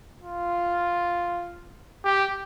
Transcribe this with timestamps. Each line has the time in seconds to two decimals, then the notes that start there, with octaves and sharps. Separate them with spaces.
0.21 F4
2.05 G4